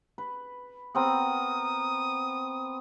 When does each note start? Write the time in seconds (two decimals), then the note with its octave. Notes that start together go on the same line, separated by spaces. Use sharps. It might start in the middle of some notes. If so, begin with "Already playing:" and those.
0.18 B4
0.95 B3 C4 A#4 D#6